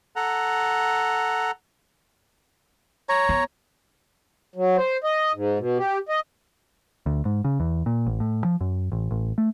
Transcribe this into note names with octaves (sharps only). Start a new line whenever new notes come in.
A4 F#5 A#5
C#5 A#5
B3
F#3
C5
D#5
G#2
B2
G4
D#5
D2
G#2
C#3
E2
A#2
A1
A2
F3
F#2
A1
A1
A3